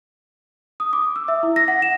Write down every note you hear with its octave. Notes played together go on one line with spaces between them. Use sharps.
D#6
D6
E6
E5
E4
A#6
F#5
E7